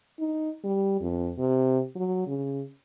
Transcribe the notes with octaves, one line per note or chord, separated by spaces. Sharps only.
D#4
G3
F2
C3
F#3
C#3